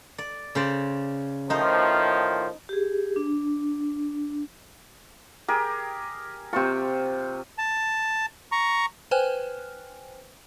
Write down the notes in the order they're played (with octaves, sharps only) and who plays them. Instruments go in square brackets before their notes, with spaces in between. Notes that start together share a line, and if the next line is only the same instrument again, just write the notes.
[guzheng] D5
C#3 C5 D5
[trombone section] A2 D#3 F3 [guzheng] D#4 C5
[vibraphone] G4 G#4
D4
[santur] G4 G#4 A#4
[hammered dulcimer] C3 C#6 [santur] F4 C5 G5
[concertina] A5
A#5 C#6
[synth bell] B4 C5 G5 G#5 F6 F#6